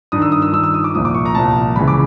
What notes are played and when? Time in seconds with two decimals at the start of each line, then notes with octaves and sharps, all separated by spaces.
0.12 G2 D#3 D#6
0.22 E6
0.32 D#6
0.42 E6
0.52 G2 D#3 E6
0.64 E6
0.74 D#6
0.84 D6
0.94 C2 A#2 F3 D#6
1.05 D6
1.14 C#6
1.25 A#5
1.35 C2 A#2 F3 A5
1.76 C#2 C#3 E3 B5
1.88 D6